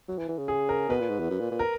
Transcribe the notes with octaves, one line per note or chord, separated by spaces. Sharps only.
F#3
E3
E3
C#3
G#4
A#4
B2 B4
A#2
G#2
E2
F#2
A#2
A#2
A#4